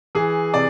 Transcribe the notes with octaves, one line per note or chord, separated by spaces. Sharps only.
E3 G#4
C3 D5